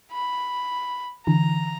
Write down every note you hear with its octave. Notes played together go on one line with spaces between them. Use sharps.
B5
D3 E3 A#5